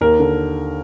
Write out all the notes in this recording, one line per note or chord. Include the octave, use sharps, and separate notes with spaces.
D#2 A#4
D3